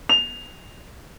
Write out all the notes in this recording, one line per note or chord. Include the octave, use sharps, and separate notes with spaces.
F7